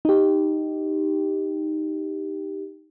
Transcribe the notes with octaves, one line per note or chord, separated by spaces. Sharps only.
D#4 G4